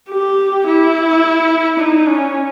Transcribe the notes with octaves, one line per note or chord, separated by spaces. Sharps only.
G4
E4
D#4
C#4